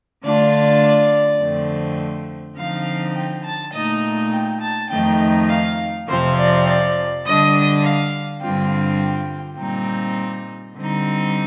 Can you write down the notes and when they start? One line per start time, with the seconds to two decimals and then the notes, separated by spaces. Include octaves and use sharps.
0.24 D3 A3 D4 F4 D5
1.40 F2 D3 A3 C4
2.57 D3 F3 C4 D#4 F5
3.16 G5
3.45 A5
3.75 A#2 A3 D#4 D#5
4.33 G5
4.62 A5
4.91 F2 D#3 A3 D#4 G5
5.50 F5
6.08 F2 C3 F3 C4 C5
6.38 D5
6.67 D5
7.25 D3 G3 D4 D#5
7.84 F5
8.42 G2 D3 G3 C4 F4 G5
9.01 G5
9.59 A#2 G3 C4 D#4 G5
10.77 D3 G3 C4 D#4